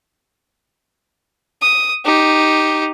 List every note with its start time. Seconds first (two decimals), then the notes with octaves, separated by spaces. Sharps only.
1.62 D#6
2.05 D#4 G4